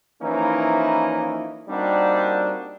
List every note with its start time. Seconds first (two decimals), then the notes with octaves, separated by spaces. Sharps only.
0.21 E3 F3 A#3 C#4 D#4 E4
1.69 G3 A#3 C4 D4 D#4 F#4